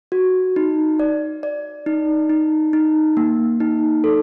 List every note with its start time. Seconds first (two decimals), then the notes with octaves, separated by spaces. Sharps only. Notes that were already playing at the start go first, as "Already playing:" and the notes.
0.12 F#4
0.56 D#4
1.00 D5
1.43 D5
1.86 D#4
2.30 D#4
2.73 D#4
3.17 A#3
3.60 D#4
4.04 A4